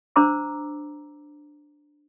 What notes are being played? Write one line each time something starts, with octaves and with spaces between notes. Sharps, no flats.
D4 C5 A#5 D6 E6